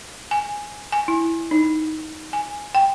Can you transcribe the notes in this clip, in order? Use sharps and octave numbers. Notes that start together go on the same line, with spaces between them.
G#5
G#5
E4
D#4
G#5
G5